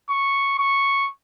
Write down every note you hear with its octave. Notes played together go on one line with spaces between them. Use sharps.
C#6
C#6